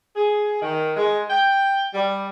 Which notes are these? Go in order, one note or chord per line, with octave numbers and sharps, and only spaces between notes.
G#4
D#3
G#3
G5
G3